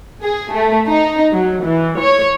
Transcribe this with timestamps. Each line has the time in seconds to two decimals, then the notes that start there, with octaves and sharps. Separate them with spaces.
0.24 G#4
0.52 A3
0.87 D#4
1.33 F#3
1.64 E3
2.00 C#5